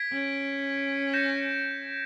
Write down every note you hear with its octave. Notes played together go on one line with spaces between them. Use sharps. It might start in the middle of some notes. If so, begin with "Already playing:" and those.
Already playing: G#6 B6 D7
C#4
G6 A#6 C#7 E7